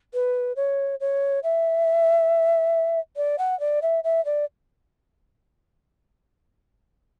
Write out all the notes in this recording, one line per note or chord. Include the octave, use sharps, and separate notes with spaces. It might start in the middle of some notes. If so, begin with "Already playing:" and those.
B4
C#5
C#5
E5
D5
F#5
D5
E5
E5
D5